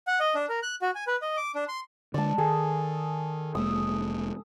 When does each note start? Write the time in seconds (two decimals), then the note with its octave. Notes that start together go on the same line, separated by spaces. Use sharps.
0.07 F#5
0.20 D#5
0.35 D4
0.49 A#4
0.63 F#6
0.82 F#4
0.95 G#5
1.07 B4
1.22 D#5
1.37 D6
1.55 D4
1.68 C6
2.14 D3 G#3 D5 A5
2.38 D#3 G#4 A4
3.55 F1 G#3 A#3 D#6 E6